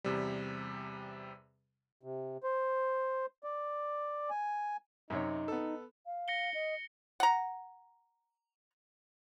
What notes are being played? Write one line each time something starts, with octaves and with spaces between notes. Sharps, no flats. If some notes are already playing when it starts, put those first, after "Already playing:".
E2 C3 G3
C3
C5
D5
G#5
F#2 C3 D#4 C#5
B3 A4
F5
A#6 C#7 G7
D#5
F#5 A#5